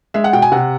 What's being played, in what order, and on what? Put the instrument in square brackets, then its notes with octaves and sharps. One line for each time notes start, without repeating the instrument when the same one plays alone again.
[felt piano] G#3 E5
F#5
B2 G5
G#5
C3 F#5